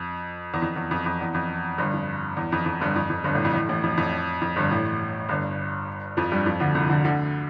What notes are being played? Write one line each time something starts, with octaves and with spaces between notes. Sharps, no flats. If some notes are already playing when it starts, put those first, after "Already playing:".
Already playing: F2
E2
F2
E2
F2
F2
E2
F2
G1 G2
F2
E2
F2
F2
G1 G2
F2
F2
G1 G2
A1 A2
F2
A1 A2
A1 A2
F2
F2
F2
G1 G2
A1 A2
G1 G2
F2 F3
G2 G3
F2 F3
D2 D3
C2 C3
D2 D3
D2 D3